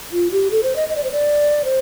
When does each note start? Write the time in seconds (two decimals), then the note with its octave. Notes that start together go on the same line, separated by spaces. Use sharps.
0.13 F4
0.32 G4
0.51 A4
0.63 C5
0.76 D#5
0.89 D#5
0.96 D5
1.04 C5
1.12 D5
1.65 C5